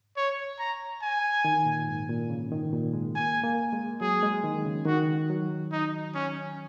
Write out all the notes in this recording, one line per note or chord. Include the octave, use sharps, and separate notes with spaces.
C#5
A#5
G#5
D#3
A#2
G#2
A#2
C#3
D#3
A#2
G#3
A#3 G#5
A#3
G#3
F#3 G#4
G#3
D#3
C#3
D#3 F#4
F#3
D#4
C#4